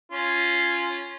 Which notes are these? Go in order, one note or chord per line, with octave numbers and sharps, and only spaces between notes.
C#4 F4